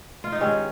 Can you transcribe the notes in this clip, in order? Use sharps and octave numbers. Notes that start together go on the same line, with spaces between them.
F4
D#4
G2 D#3 G#3 C4 C#4